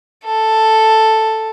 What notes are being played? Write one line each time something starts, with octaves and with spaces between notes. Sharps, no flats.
A4